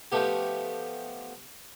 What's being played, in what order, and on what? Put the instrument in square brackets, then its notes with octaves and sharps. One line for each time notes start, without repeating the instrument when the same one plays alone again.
[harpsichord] F3 A3 B3 G4